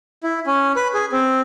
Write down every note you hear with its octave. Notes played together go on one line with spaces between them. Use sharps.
E4
C#4
B4
G#4
C4